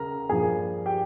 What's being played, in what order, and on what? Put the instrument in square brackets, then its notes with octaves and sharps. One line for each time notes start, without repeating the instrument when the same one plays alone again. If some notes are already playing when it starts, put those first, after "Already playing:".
Already playing: [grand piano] C#3 A#4 A#5
G2 F3 A#3 G#4 G#5
G4 G5